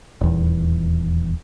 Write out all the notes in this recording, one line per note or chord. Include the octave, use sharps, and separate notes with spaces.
D#1 E2